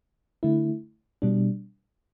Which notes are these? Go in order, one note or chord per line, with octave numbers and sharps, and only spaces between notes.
D3 A3 E4
B2 G3 D4